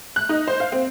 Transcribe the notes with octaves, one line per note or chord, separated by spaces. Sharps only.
F#6
D#4
C5
F5
C4